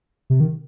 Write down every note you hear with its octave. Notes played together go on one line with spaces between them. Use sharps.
C3
D#3